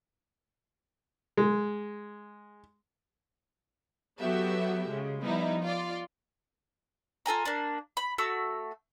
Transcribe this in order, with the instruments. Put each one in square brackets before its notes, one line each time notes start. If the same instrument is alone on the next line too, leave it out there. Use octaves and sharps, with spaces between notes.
[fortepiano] G#3
[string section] F#3 B3 F#4 G4 A4 E5
C#3 G#3
F3 G3 B3 D#4 E4
F4 D5
[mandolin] F4 A4 G#5 A#5
A#3 D4
B5
A3 F#4 E6